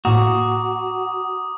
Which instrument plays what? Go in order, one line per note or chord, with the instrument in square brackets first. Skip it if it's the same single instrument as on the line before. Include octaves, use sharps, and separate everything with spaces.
[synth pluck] A2 A#3 [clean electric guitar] F#4 [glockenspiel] A#5 D6 [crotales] D#6